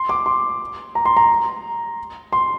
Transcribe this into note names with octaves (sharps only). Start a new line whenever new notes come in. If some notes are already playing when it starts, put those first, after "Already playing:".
Already playing: C6
D6
C6
A#5
C6
A#5
C6